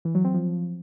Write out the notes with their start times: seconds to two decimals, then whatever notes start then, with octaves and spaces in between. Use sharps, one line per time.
0.05 E3
0.15 F#3
0.24 C4
0.34 F3